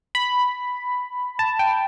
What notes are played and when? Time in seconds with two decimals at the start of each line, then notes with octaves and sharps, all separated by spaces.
0.15 B5
1.39 A5
1.59 G5